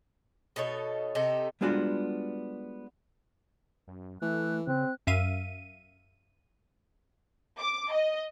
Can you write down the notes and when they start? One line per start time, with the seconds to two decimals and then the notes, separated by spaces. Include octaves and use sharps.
0.56 B2 D#4 A4 C#5
1.15 C3 D#4 G4 A4
1.61 G3 G#3 B3 D4 F4 F#4
3.88 F#2
4.22 E3 A3 F#6
4.67 C#3 C4 F#6
5.07 F#2 E5 F5 D#7
7.59 D6
7.93 D#5